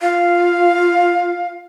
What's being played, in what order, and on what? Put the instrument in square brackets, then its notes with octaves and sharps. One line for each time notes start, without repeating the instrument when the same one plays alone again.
[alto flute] F4 [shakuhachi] F5